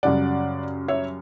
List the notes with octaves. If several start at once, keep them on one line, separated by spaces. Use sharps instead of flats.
F#2 C#3 G3 D5 F#5
C#5 E5